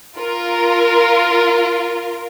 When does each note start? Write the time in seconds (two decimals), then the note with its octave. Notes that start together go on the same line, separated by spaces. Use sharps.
0.18 F4 A#4